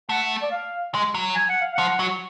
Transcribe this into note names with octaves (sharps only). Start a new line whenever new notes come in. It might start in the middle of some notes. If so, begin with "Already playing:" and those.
A3 F#5
D5
F5
G#3
F#3
G#5
F#5
F5
F3 F#5
F#3